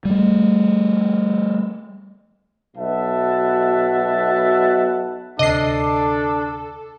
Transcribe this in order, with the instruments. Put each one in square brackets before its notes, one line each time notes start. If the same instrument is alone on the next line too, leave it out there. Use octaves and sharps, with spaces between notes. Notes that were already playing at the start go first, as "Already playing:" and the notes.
[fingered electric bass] G3 A3
[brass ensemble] B1 B2 E5 F#5 A5
[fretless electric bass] D2 C3 [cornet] D4 [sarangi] A4 [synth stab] D#5 C7